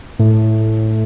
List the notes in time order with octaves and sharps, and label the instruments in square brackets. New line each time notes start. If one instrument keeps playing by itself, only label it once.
[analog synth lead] A2